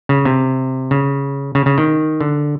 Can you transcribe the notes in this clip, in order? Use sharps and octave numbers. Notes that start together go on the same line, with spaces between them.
C#3
C3
C#3
C#3
C#3
D#3
D3